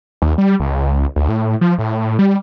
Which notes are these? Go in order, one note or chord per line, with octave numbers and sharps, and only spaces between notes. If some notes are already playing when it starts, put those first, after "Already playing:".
D#2
G3
C#2
D2
A2
F3
A2
G3